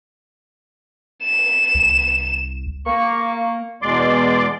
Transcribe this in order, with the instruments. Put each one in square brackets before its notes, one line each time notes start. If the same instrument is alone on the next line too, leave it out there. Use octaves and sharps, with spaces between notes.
[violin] E7
[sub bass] C2
[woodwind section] A#3 [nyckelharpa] C#6
[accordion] E2 B2 G#3 D5 C6 D6